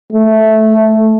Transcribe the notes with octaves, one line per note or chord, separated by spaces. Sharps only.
A3